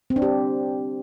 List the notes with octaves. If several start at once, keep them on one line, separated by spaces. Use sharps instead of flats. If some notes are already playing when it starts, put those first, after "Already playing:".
C4
D4
G4